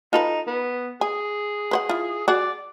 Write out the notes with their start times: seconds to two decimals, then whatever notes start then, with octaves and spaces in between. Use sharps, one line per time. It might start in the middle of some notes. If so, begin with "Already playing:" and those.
0.13 D#4 F4 A4 B4
0.47 B3
1.01 G#4 G#5
1.71 B4 C5 F#5
1.89 E4 F4
2.28 F#4 G#4 D5 F#5